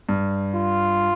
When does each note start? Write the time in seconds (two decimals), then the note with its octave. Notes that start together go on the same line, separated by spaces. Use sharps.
0.09 G2
0.55 F4